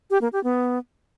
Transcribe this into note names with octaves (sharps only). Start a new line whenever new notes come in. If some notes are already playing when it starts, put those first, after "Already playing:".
G4
A#3
G4
B3